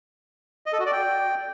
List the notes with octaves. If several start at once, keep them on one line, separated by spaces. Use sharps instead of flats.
D#5
A4
F#4
D5
G5